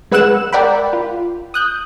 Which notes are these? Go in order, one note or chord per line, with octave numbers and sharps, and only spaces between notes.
G#3 B4 F#5 E6 F#6 E7
A#4 D5 F#5 G5 B5
F4
D#6 F#6 G6